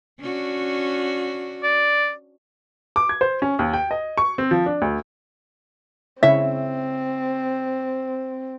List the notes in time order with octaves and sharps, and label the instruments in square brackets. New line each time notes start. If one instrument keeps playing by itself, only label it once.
[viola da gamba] C#4 D4 F#4
[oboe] D5
[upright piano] D6
G#6
C5
C#4
D#2
G5
D#5
C#6
C4
F3
D4
D2
[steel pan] C#3 E4 C#5 [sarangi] C4 [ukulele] E5